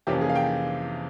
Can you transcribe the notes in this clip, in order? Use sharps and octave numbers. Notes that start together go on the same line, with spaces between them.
F2 C3 E3 A#3 C#4 G4
G#4
F5
G5